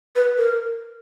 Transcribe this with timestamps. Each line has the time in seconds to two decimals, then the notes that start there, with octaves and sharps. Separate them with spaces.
0.16 B4
0.38 A#4